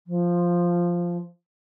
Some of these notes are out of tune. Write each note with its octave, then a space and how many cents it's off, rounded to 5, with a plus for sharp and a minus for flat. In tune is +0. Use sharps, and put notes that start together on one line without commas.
F3 +0